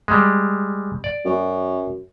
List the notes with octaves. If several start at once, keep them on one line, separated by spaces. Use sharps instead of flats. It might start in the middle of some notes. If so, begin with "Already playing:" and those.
G3 G#3
D5
F#2